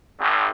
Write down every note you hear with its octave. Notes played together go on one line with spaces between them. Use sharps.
G#1